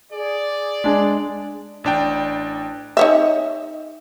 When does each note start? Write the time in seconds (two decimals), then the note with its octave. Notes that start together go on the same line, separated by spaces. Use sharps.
0.12 G#4 D5
0.84 G#3 D4
1.84 A1 D4 G5
2.97 D#4 C#5 E5